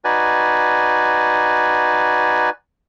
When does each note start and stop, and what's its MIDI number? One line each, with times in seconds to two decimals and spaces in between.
0.05 2.50 63
0.05 2.50 66
0.05 2.50 71
0.05 2.50 74
0.05 2.50 80